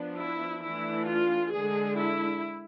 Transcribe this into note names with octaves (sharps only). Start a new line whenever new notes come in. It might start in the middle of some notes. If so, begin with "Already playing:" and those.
Already playing: F3 B3 D4
E4
E3 A3 D4 E4
F4
D3 G#3 D4 G#4
E4